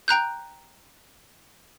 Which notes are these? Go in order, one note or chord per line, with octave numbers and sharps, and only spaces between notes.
G5 A#5 F#6 G6